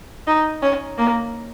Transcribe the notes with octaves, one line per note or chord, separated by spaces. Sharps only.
D#4
C#4
A#3